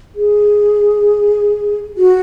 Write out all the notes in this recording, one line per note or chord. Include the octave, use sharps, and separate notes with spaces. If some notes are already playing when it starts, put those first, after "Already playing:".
G#4
F#4